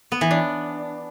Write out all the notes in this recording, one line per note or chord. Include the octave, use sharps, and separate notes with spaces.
B3
E3
D4